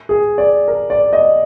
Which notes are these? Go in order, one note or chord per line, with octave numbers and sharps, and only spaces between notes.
G#4
D5
A#4
D5
D#5